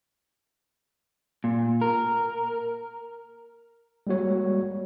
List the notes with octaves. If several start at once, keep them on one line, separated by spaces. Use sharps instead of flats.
A#2
A#4
G3 G#3 A#3 F#4 C#5